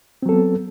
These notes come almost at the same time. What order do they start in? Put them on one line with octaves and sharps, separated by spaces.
C4 F#3 A4 B3